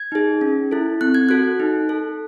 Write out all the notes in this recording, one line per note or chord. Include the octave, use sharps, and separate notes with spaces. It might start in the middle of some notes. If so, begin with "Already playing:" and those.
Already playing: G#6
D#4 G#4
C#4
E4 A4
C4 F#6
G#6
F#4 A4 F#6
D#4
A4